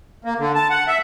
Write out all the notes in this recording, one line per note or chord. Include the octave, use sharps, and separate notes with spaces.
A#3
D3
A5
F#5
E5